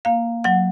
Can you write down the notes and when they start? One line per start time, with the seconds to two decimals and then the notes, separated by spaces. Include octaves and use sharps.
0.05 A#3 F5
0.44 F#3 F#5